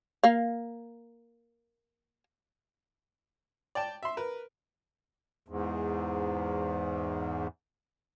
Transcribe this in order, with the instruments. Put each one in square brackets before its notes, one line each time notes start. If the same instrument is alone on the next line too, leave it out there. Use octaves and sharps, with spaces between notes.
[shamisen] A#3 F5
[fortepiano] D5 G5 A5
E5 C6
A#4 B4
[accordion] E2 G#2